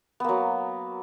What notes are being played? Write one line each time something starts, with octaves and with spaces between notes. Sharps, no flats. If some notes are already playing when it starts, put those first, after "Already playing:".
F#3 A#3 B3